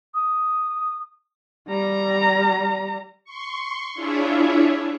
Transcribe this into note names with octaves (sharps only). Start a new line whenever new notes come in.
D#6
G3 A#5
C6 C#6
D4 E4 F4 G#4 C#5 E5